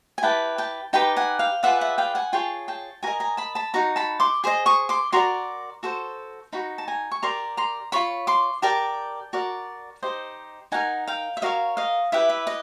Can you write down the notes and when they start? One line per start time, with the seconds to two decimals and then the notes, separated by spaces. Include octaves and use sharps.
0.18 G#5
0.23 E4 G4 B4 G5 A5
0.58 G5 A5
0.93 D#4 G4 B4 G5 A5
1.16 F#5 G#5
1.39 F5 G5
1.63 F4 G#4 B4 D5 E5 F#5
1.81 E5 F#5
1.98 F5 G5
2.15 F#5 G#5
2.33 F4 G#4 C#5 G5 A5
2.68 G5 A5
3.03 F#4 A#4 D#5 G#5 A#5
3.20 G#5 A#5
3.37 A5 B5
3.55 A5 B5
3.74 D#4 F#4 A#5
3.96 A5 B5
4.20 C6 D6
4.44 G#4 C5 D#5
4.66 C#6 D#6
4.89 C6 D6
5.12 F#4 A#4 D5 A#5 C6
5.83 F#4 A4 C5
6.52 D#4 F#4 B5
6.78 A5
6.88 G#5 A#5
7.11 C#6
7.22 G4 A#4 D5 A#5 C6
7.57 A#5 C6
7.92 F4 A4 C#5 B5 C#6
8.27 C6 D6
8.62 G4 A#4 D5 G5 A5
9.33 F#4 A#4 D5
10.02 D#4 G4 C5 D#5
10.72 D#4 G4 A#4 F#5 G#5
11.07 F5 G5
11.37 E5
11.42 F#4 A#4 C#5 D#5 F5
11.77 D#5 F5
12.12 E4 G4 B4 E5
12.29 E5
12.47 D#5